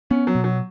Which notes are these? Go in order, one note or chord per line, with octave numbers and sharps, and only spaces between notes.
B3 C#4
F#3
B2
F#3